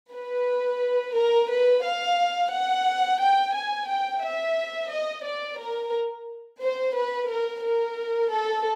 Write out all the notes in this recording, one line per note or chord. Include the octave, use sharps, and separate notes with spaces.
B4
A#4
B4
F5
F#5
G5
G#5
G5
E5
D#5
D5
A#4
C5
B4
A#4
A#4
A4